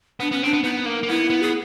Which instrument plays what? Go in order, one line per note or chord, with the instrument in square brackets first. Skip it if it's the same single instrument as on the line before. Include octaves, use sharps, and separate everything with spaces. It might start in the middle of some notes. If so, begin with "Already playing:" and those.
[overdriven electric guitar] B3 [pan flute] D4
[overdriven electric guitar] B3 [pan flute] C#4
[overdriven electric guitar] C4 [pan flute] D4
[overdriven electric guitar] B3
[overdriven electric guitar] B3 [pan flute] D#4
[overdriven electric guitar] A#3
A#3
[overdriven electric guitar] B3 [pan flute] E4
[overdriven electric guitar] B3
[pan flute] G#4